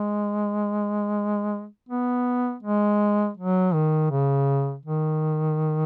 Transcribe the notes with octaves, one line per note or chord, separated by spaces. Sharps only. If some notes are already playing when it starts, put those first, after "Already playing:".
Already playing: G#3
B3
G#3
F#3
D#3
C#3
D#3